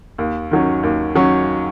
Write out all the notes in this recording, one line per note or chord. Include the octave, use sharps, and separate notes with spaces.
D#2
D#3 F#3 C#4
D#2
D#3 F#3 C#4